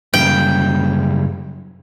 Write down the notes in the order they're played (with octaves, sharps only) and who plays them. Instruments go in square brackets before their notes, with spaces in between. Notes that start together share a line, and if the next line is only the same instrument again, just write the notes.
[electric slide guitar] F#2 C#3 G3 [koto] G5